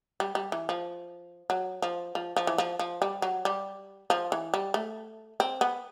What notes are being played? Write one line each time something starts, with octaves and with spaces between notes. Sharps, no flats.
G3
G3
E3
F3
F#3
F3
F3
F3
E3
F3
F3
G3
F#3
G3
F3
E3
G3
A3
C4
B3